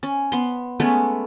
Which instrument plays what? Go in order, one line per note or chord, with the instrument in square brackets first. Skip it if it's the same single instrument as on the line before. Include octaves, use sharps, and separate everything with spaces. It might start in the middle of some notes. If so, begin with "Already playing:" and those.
[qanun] C#4
B3 C6
G#3 A3 B3 C#4